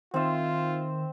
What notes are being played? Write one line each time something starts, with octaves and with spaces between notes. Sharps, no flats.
D#3 C4 F4 E5